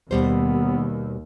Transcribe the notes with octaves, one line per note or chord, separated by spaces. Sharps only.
D#2 B2 G3 B3 C5